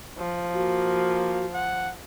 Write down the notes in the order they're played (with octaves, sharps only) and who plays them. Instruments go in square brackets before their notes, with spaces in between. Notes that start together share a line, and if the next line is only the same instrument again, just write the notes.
[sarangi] F3
[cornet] A#3 [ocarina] F#4
[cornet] F#5